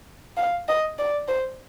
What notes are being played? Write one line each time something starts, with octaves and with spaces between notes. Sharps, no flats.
F5
D#5
D5
C5